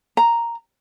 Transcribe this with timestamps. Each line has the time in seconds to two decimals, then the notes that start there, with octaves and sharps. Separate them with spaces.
0.17 A#5